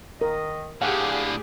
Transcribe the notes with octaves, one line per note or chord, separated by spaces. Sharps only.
D#3 A#4 D#5
A2 D3 G4 G#4 D5 F5 F#5 G#5